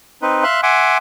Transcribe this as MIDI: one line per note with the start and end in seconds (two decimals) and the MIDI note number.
0.22 0.44 60
0.22 0.44 63
0.22 0.44 71
0.44 0.61 76
0.44 0.61 77
0.44 0.61 84
0.44 0.61 90
0.63 0.98 76
0.63 0.98 78
0.63 0.98 80
0.63 0.98 84
0.63 0.98 86